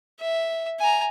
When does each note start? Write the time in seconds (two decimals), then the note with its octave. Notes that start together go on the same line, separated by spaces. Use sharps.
0.20 E5
0.80 G#5 A#5